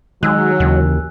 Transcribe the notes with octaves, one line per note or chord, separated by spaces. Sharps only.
D#3 F#3 G#3 G#5 E6 F#6
D#2 C#3 E3